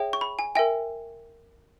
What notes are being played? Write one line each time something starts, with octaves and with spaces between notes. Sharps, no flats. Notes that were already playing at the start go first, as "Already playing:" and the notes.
Already playing: G#4 C#5 E5 G5
C#6
B5
G#5
A#4 E5 G5 G#5